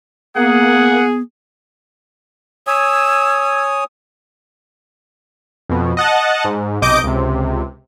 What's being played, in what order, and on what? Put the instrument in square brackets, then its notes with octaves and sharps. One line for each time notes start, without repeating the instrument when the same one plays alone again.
[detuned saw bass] A#3 [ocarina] B3 [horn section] G#4 [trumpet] F#5
[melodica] C#5 G#5 D#6 [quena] E6
[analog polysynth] F2 B2
D#5 F#5 A5
G#2
B1 C3 D#5 D6 G6 D7
C#2 C3